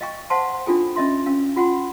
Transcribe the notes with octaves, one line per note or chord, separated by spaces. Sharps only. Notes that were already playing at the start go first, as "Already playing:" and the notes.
D#5 F5 G5 C#6
C5 F5 F#5 A5 C6
D4 E4 F4 A4 G5
C#4 D#5 E5 C6
C#4 F5
F4 F#5 G5 C6